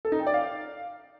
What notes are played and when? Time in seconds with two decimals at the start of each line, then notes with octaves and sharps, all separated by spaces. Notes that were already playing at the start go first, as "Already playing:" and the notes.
0.05 A4
0.12 D#4
0.19 G5
0.27 D5
0.34 F5